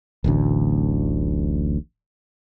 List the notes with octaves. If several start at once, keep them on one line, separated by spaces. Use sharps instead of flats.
D1 A1 D2